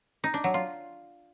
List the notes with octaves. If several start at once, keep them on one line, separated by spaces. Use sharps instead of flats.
D#4
D4
F#3
F4